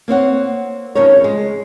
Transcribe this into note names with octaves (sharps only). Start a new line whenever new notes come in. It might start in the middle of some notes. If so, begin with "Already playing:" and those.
A#3 C4 C#5 F#5
F2 C#3 C#4 D#4 A#4 C#5
G#3